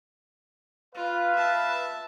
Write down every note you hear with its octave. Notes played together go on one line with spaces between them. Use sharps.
F4 B4 F5
E5 A5